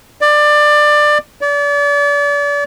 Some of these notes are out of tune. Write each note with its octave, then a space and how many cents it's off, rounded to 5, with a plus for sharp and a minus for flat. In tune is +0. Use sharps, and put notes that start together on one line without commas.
D5 +20
D5 -35